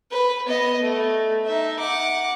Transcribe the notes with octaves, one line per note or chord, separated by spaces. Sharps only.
B4
B3 D#5
A3
D#4 E5
F#5 D6